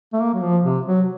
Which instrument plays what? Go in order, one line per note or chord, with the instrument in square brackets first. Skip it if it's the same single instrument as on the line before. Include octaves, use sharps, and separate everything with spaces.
[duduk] A3
A#3
F#3
F3
C3
F#3